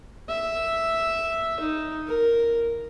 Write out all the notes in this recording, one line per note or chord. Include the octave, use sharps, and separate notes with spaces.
E5
D#4
A#4